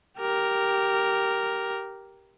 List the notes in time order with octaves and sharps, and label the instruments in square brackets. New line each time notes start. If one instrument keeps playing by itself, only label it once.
[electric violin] G4 A#4